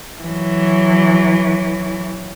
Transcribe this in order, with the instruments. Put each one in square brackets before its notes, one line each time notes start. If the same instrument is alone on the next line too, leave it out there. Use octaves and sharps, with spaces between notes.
[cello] E3 F#3